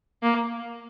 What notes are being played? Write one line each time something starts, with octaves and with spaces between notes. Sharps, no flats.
A#3